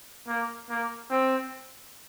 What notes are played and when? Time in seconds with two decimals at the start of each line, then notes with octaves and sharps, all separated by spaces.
0.28 A#3
0.70 A#3
1.11 C4